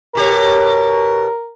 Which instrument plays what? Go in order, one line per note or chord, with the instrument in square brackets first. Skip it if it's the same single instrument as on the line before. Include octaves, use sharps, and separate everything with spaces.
[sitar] B2 G4 C#5 [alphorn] A#4